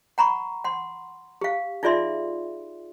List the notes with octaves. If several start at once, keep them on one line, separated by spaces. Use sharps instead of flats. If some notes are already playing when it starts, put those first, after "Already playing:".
F#5 A#5 B5 C#6
F#5 C6
G4 F5
D#4 F4 G#4 D5 E5 C6